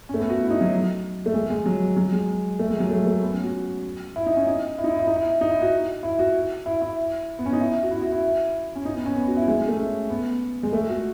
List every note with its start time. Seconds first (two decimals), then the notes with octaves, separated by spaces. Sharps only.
0.09 C#4
0.14 A3
0.19 B3
0.30 F#4
0.40 E4
0.50 D#4
0.61 F#3
1.26 A3
1.34 G#3
1.50 G#3
1.66 F#3
1.96 F#3
2.12 G#3
2.59 A3
2.70 G#3
2.80 F#3
2.90 A3
3.06 A3
3.22 B3
3.32 C#4
3.43 F#4
4.16 E4
4.26 D#4
4.36 C#4
4.47 D#4
4.78 E4
4.84 D#4
4.89 E4
4.99 E4
5.07 D#4
5.16 E4
5.41 D#4
5.51 E4
5.62 F#4
6.03 E4
6.19 F#4
6.66 E4
6.82 E4
7.39 B3
7.46 C#4
7.52 D#4
7.60 E4
7.83 F#4
7.91 E4
8.02 F#4
8.12 E4
8.75 C#4
8.85 D#4
8.96 B3
9.06 C#4
9.16 B3
9.27 F#4
9.37 E4
9.48 G#3
9.58 G#3
9.68 A3
9.79 C#4
10.10 B3
10.63 G#3
10.73 A3
10.89 F#4